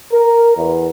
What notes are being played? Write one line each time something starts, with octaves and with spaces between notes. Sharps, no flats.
A#4
E2